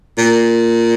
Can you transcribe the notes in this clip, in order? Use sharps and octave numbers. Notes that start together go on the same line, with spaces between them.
A#2